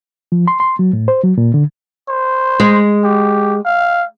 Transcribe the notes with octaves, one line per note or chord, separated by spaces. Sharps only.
F3
C6
C6
F#3
A2
C5
F#3
A#2
D3
C5
G#3
G4
F5